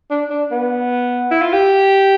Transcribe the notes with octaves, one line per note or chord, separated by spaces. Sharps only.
D4
D4
B3
E4
F4
G4